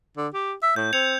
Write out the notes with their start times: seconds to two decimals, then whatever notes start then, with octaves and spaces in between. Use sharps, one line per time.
0.17 D3
0.34 G4
0.63 E5
0.76 A2 G6
0.93 C4 G#6 C#7 F7